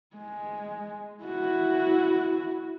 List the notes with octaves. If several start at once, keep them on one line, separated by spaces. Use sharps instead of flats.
G#3
E4 F#4